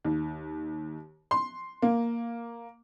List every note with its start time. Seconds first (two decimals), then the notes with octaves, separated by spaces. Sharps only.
0.05 D#2
1.31 C6
1.82 A#3